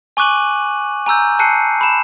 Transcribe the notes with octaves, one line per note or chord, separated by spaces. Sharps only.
G#5 C#6 D6 F#6 D#7 F#7
G#5 A#5 E6 G6
A5 F#6 C7 C#7 D#7
B5 E7